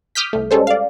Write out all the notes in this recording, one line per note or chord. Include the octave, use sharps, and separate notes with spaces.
D6 D#6 F6 G6 B6
C2 A3
G3 G#3 C#4 A4 C5
D5 F5